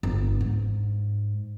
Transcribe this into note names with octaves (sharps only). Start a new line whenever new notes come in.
G1
G#2